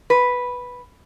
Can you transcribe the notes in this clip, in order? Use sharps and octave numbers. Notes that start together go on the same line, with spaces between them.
B4